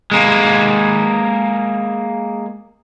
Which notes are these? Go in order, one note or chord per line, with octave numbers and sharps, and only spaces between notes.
G#3 A#3